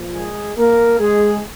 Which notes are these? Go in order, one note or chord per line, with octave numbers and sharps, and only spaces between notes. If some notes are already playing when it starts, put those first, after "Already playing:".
Already playing: A#2 F3
G#3 G#4
A#3 A#4
G#3 G#4